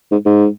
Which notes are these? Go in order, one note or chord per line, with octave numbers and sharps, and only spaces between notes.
G#2
G#2